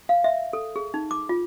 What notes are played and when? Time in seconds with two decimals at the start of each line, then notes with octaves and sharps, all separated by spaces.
0.09 F5
0.24 E5
0.53 A4
0.76 G#4
0.94 D#4
1.11 D6
1.29 F4